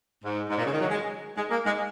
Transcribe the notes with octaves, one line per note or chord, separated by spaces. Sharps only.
G#2
G#2
A#2
C#3
D#3
F#3
G#3
G#3
A#3
G#3